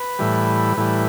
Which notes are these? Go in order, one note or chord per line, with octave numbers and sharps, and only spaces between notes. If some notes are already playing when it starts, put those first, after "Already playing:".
Already playing: B4
A2 E3 G3
A2 E3 G3